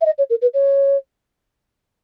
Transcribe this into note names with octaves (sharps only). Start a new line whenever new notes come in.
E5
D#5
C#5
A#4
B4
C#5